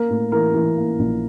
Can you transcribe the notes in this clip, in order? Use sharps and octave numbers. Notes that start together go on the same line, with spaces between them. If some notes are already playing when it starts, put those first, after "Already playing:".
Already playing: A#3 A#4
A2
E3 A#4
E3
A#3
A#1